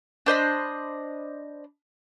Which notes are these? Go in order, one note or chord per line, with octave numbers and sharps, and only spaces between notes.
D4 C5 D#5 B5